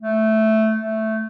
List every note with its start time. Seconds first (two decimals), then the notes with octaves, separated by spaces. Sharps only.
0.01 A3
0.80 A3